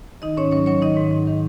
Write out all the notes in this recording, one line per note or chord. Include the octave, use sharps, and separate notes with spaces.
D#3 D#4 D#5
G#2 C#4 C#5
F#3 C#4 C#5
F#3 C#4 C#5
D#3 D#4 D#5
G#2
G#2
D#3